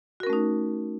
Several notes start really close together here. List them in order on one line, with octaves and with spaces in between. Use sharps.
F#4 A#4 C#4 A3 D#4